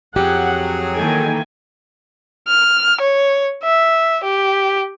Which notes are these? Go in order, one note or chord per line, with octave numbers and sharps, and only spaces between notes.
F2 F#3 G4 G#4 F#5
D#3 E3 A#3 A4 G5 G#5
F6
C#5
E5
G4